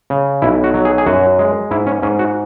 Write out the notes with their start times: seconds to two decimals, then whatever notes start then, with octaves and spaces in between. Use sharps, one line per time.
0.10 C#3
0.42 B1 E4
0.64 F#4
0.74 F#3
0.85 G#4
0.98 G#4
1.06 F#2 F#4
1.39 G#3
1.71 G#2 E4
1.87 C#4
2.02 G#2 C#4
2.19 F#4